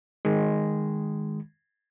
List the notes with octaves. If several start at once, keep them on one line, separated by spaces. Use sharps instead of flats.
D#3 G#3